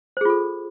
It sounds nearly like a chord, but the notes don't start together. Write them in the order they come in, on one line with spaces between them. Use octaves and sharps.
C5 G#4 F4 A4